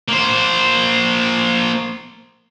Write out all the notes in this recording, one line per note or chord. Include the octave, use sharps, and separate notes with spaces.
A#3 C5